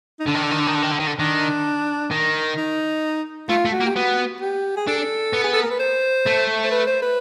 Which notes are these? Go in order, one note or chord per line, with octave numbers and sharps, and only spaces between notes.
D#4
D3 D4
D#3
D3
D#3
D3
D#3
D3
D#3
D3
D#3
D3
D#3 D4
D#3
D#4
A3 F4
A3
F#4
A#3
G4
B3 F#4
G4
G#4
D4 A4
B3
G#4
A4
A#4
B4
C5
A3
C5
B4
C5
B4